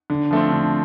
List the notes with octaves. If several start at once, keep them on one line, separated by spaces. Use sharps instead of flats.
D3
F3 A3 C4
D3